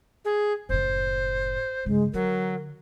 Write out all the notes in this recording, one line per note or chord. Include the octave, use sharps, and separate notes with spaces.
G#4
F#1 A2 C5
G2 C#3 G#3
D3 F#3 A#4